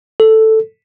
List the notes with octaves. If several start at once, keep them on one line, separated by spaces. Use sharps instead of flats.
A4